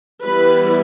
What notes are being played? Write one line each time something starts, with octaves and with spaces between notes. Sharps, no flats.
E3 G3 B3 E4 B4